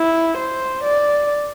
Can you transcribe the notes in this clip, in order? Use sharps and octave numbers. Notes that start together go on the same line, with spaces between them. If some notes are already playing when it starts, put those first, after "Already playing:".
Already playing: E4
C5
D5